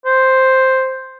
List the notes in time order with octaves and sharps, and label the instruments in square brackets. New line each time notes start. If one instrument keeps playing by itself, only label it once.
[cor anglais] C5